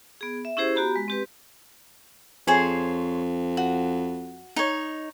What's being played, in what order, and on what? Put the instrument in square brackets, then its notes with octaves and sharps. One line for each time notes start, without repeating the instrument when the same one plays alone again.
[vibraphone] B3 G#4
E5
C#4 E4 G4 G#4 C5
B3 F#4 G4 A#5 B5
G#3
C4 G4 B4
[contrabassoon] F2 [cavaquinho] G#4 C5 C#5
[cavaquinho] F#4
D#4 C#5